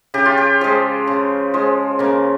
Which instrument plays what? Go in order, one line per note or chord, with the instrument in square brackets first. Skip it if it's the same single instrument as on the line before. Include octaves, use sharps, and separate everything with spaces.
[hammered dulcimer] C#3 G4
F4
G4
F3 G#3
C#3
F3 G#3
C#3 A#3